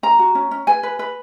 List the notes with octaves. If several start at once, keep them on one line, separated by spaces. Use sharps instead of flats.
C#4 A#5
F#4
C#4
C#4
B4 G#5
B4
B4